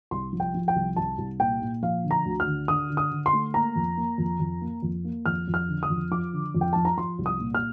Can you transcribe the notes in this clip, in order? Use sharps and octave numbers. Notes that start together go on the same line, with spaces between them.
C2 C6
F3
G5
F3
G5
C2
C2 A5
C2
A#2 G5
A#2
F3 F5
D3
A#5
D2
F6
D3
D3 D#6
D3
D#6
D3
C6
A3
A#3 A#5
F2
A#3
F2
F2
A#3
F2
A#3
F2 F6
F2
F6
D3
D#6
F2
F3 D6
D3
F2
G5
F3 A5
A#5
F3 C6
C2
D#6
A#2
F6